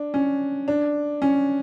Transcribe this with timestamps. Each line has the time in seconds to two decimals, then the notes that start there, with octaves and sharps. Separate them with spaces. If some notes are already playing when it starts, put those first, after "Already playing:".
Already playing: D4
0.14 C#4
0.68 D4
1.22 C#4